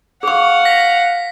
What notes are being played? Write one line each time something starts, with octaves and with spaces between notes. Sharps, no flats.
G#4 F5 F#5 C#6
A#6 B6